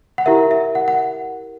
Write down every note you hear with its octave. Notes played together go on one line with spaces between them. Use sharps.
F#5
E4 G4 A#4 E5
E5
F#5
F#5